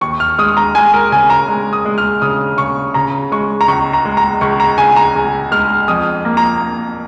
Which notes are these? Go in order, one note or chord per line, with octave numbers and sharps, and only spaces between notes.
D#2 C#6
F6
G#3 D#6
A#5
G#3 G#5
A#4
C#3 G#5
A#5
G#3
D#6
G#3
F6
C#3 D#6
C#3 C#6
C#3 A#5
G#3 C#6
A#5
C#2 C#6
A#5
G#3
A#5
C#2 C#6
A#5
C#2 G#5
A#5
C#2
G#3 F6
F2 D#6
A#3
A#5
A#3